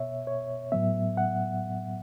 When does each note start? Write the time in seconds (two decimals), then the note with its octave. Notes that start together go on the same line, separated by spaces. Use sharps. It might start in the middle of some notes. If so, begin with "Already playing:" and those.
Already playing: B2 B3 C#5 E5
0.27 C#5
0.72 A2 F#3 B3 E5
1.17 F#5